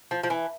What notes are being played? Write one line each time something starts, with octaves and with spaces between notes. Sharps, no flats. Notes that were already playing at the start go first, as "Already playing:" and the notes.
F3
F3
E3